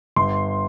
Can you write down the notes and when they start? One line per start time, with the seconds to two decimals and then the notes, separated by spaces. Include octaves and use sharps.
0.16 G1 C6